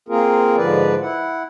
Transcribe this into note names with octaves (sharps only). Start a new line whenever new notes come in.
A#3 C4 F4 G#4 A#4
G#2 D3 F3 B4 D5
E4 F#5